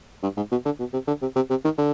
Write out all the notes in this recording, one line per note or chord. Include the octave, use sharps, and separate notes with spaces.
G2
G#2
B2
D3
B2
C3
D3
C3
C3
C3
D#3
D3